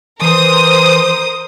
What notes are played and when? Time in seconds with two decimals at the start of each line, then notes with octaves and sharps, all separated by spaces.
0.22 E3 A#4 C5 D#6